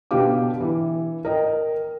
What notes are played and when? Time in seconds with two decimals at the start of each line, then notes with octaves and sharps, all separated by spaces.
0.11 B2 D3 B3 G4 F5 D6
0.60 E3
1.25 A#4 D#5 G5